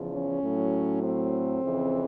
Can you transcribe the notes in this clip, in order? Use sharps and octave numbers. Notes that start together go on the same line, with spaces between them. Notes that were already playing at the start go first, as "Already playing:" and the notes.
Already playing: E2 C#3 F3
C#4
A2 F#3
C4
F2 C#3 E3